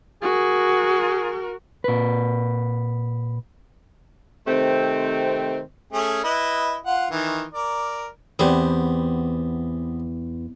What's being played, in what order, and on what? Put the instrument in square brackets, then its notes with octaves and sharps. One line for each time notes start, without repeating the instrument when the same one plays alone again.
[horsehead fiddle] F#4 A#4 [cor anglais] G#4
[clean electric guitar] A#2 B4
[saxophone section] C3 D#3 A3 C4
[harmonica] A3 C#4 G#4
E4 B4 D#5
F4 F#5
D#3 E3
A#4 D5
[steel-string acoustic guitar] E2 [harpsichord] B3 C4 G4